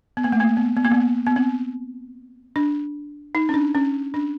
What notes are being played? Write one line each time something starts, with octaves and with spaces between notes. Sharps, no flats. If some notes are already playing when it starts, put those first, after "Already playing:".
B3
A#3
A3
A#3
B3
B3
A#3
B3
B3
C4
D4
D#4
C#4
D4
C#4
D4